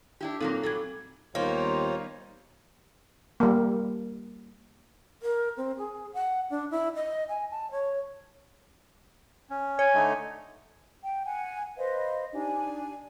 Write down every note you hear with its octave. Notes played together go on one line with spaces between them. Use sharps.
D4 E4 G4
A#2 F#3 A#3 C4 D#4 A4
A#2 F#3 G3 A4 G#6
D#2 G3 A#3 B3 D#4 F4 C5 C#5
G3 A#3
A#4
C4
G#4
F#5
D4
E4
D#5
G#5
A5
C#5
C#4
C#5 G#5
D3 A3 D#4
G5
F#5 G#5
B4 C5 D#5 F5
D4 D#4 G4 G#5